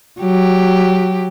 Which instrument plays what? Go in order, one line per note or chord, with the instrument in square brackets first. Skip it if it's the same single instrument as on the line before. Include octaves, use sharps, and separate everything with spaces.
[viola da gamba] F#3 G4